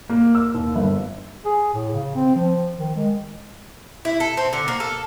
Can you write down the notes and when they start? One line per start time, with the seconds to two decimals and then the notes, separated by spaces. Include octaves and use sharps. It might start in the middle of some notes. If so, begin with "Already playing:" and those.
0.09 A#3
0.35 E6
0.54 D#2
0.75 G1
1.45 G#4
1.74 A2
1.93 C#3
2.15 C4
2.36 F3
2.77 D#3
2.96 G#3
4.05 E4
4.20 A4
4.37 C4
4.53 D3
4.68 A#3
4.80 A4